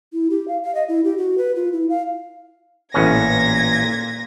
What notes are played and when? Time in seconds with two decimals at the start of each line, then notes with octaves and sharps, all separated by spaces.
0.13 E4
0.30 G4
0.48 F5
0.63 F5
0.75 D#5
0.89 E4
1.04 G4
1.18 F#4
1.38 B4
1.56 F4
1.73 E4
1.89 F5
2.94 A1 A#2 B3 C#4 G#6 A#6